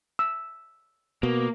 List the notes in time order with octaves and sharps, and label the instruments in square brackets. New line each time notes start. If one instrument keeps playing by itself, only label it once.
[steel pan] E6
[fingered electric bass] B2 [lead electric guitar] A#3